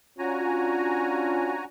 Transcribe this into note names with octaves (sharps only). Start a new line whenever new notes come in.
C#4 D4 F4 F#4 G#5 A#5